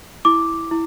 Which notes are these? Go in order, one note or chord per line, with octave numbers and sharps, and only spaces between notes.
E4 D6
E4